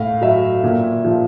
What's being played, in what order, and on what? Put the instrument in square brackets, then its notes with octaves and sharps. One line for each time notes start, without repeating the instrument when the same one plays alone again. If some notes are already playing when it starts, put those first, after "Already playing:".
Already playing: [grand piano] A2 F5
F#3 E5
A#2
F3